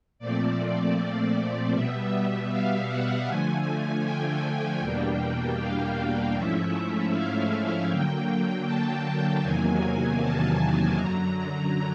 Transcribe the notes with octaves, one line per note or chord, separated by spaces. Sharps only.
A#2 F3 A3 C4 D5
D5
B2 G3 B3 E5
F5
F#5
D3 F3 A3 G#5
G5
E2 B2 G3 A#3 D4
F5
G#2 F3 A3 C#4 E4 E5
F5
D3 F#3 A#3 G5
A5
E2 C3 D#3 F#3 A#3 G#5
A5
A5
F#2 D3 F#3 A#5